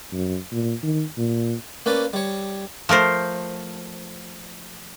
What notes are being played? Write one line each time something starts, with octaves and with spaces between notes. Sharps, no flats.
F#2
A#2
D#3
A#2
A#3 C#4 B4 D5
G3 C#5
F3 A3 A#4 C5